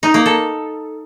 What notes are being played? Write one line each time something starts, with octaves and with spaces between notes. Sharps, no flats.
D#4
A#3
A4